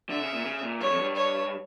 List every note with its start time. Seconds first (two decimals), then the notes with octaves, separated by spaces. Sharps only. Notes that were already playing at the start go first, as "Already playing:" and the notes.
0.09 D3 E5
0.21 C#3
0.34 A#2
0.45 C#3
0.63 A#2
0.80 G2 C#5
0.91 F2
0.99 G2
1.16 C#5